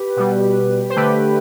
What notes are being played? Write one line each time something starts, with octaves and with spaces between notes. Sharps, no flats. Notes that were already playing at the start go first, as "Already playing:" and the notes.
Already playing: G4 B4
B2 G3
C5
D3 A3 G4 B4